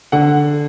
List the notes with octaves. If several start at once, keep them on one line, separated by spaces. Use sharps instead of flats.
D3 F#5